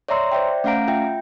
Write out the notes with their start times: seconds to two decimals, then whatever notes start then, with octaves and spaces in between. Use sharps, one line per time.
0.09 C#5 D5 E5 A#5 C6 E6
0.32 C5 D5 E5 G5
0.64 A3 C#4 F5 F#5 A#5 D7
0.88 F4 E5 G5